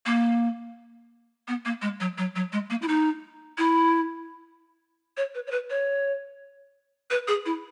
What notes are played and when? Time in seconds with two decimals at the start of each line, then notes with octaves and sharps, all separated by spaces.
0.06 A#3
1.48 B3
1.65 A#3
1.82 G#3
2.00 F#3
2.18 F#3
2.36 F#3
2.52 G#3
2.70 A#3
2.82 E4
2.88 D#4
3.58 E4
5.17 C#5
5.34 B4
5.47 C#5
5.51 B4
5.70 C#5
7.10 B4
7.28 G#4
7.46 E4